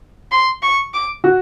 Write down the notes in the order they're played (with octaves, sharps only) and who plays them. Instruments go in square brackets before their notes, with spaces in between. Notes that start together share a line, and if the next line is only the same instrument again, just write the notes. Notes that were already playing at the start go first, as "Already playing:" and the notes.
[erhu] C6
C#6
D6
[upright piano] F#4